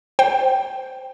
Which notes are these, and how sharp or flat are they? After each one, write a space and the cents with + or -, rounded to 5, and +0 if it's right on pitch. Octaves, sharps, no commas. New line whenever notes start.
C5 -5 G5 -15